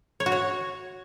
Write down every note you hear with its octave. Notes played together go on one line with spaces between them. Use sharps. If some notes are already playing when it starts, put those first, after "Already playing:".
C#5
F#4
C#5